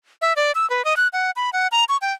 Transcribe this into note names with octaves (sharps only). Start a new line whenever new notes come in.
E5
D5
E6
B4
D#5
F#6
F#5
B5
F#5
A#5
C#6
G5